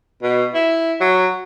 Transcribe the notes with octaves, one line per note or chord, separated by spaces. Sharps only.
B2
E4
F#3